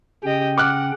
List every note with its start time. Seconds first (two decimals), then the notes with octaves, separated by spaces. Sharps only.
0.24 C#3 C#4 G4 D#5 G5
0.58 F#5 D6 F6 F#6